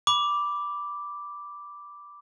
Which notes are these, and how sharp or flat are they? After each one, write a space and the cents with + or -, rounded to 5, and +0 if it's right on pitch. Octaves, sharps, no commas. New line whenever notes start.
B5 +0 D6 +0